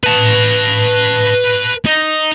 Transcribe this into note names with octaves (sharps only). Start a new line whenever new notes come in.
B4 A5
D#4